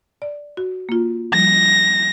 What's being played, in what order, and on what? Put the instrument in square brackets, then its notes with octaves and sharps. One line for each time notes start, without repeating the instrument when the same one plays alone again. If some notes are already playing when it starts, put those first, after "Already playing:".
[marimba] D5
F#4
A#3 F4
[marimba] F3 G3 [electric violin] A#6